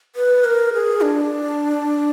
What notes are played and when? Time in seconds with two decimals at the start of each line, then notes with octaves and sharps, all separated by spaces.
0.16 B4
0.44 A#4
0.74 G#4
1.01 D4